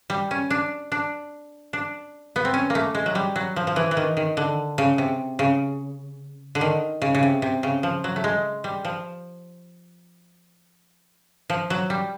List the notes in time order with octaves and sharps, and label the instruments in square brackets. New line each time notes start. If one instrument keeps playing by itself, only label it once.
[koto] G3
C#4
D4
D4
D4
B3
C4
C#4
A#3
A3
G#3
F#3
G3
F#3
F3
F3
E3
E3
D#3
D#3
D3
C#3
C3
C#3
D3
D#3
C#3
C#3
C3
C3
C#3
F3
F#3
A3
G#3
G3
F3
F3
F#3
G3